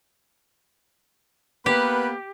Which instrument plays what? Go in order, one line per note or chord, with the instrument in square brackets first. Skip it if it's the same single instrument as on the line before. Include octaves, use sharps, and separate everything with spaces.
[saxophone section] A#3 B3 [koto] G4 [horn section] B4 B5